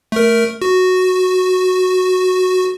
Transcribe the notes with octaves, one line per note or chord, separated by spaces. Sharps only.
A3 A#4
F#4